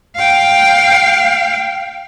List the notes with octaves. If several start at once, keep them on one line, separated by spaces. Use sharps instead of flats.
F5 G5